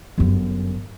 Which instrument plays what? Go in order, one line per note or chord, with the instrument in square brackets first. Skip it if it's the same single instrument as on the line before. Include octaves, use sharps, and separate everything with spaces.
[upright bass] G1 F#2